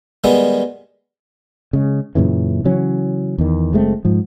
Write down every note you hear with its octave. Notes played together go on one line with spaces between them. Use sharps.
D#3 G3 G#3 B3
C#3 G#3
F#2 A#2 C#3 E3
C#3 E3 F#3 C#4
E2 D#3
F#1 G#3 A3 C4
G#2 F3